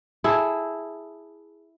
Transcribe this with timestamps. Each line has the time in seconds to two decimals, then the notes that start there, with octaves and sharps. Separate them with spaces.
0.24 E4 G#4 A4